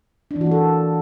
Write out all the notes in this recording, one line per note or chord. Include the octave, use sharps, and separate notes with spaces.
D4
E3
F#4
A#3
A4